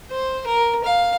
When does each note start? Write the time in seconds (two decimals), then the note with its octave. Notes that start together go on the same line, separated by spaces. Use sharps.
0.11 C5
0.47 A#4
0.84 F5